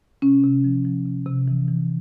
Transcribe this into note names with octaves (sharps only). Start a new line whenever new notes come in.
C3 C#4
C3
F3
F3
C3
C3
E3
E3